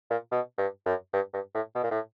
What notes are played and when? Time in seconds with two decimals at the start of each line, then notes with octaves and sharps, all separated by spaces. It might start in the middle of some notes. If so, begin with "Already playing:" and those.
0.11 A#2
0.32 B2
0.58 G2
0.86 F#2
1.14 G2
1.34 G2
1.55 A2
1.75 B2
1.83 A#2
1.91 A2